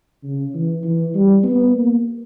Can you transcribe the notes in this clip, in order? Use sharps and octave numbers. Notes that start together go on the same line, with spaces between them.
C#3
E3
E3
G3
B3
A#3